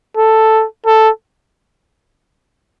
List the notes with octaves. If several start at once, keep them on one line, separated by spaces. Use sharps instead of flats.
A4
A4